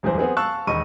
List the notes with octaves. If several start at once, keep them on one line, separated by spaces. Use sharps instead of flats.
D1 E2 G2 G#4 C5
B3 C4 G#4 B4
F5 A5 C#6 E6 F#6
E1 D#2 D#4 B5 C#6 D#7